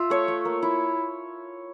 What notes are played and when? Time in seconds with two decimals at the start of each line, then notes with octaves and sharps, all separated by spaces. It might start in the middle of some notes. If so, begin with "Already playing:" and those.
Already playing: F4 E5
0.10 A3 C#5
0.28 A3
0.45 A#3
0.62 E4